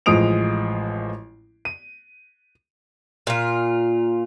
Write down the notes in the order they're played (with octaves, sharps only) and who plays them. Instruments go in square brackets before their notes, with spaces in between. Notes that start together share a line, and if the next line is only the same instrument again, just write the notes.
[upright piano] A1 F3 G#3 D#6 D7 F7
D#7
[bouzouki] A#2 F4